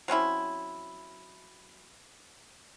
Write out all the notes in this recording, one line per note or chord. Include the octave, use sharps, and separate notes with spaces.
F#3 C4 C#4 E4